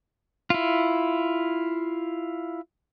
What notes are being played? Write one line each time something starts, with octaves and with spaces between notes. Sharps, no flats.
E4 F4